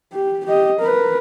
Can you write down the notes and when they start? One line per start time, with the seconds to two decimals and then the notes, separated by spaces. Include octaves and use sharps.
0.13 G4
0.46 G4 D#5
0.80 A#4 B4